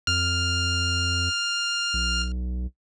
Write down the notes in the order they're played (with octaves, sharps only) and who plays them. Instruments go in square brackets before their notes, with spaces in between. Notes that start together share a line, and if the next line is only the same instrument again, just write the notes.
[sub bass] F2 [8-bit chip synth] F6
[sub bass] B1